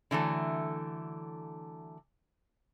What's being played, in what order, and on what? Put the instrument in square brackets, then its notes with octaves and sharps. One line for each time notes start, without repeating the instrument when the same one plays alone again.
[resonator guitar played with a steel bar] D3 E3 F#3 A3